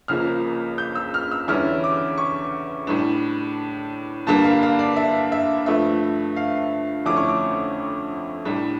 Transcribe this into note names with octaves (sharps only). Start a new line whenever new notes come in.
C#2 C#3 F3 A#3 F6
G6
E6
F6
E6
E2 D3 G3 C#4 E4 F6
D6
C#6
A2 G3 D4
G2 D3 G3 A#3 D4 A5
F5
F5
D5
E5
E5
G2 F3 A3 E5
F5
F2 D3 A3 C#4 E4 D6
C#6
D6
A2 G3 D4